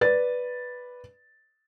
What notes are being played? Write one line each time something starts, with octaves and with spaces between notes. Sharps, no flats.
B4 D5 A6